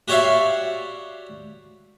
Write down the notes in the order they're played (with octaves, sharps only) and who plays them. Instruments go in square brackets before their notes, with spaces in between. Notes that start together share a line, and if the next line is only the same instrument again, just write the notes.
[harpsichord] F#4 G4 C#5 D5 E5 F5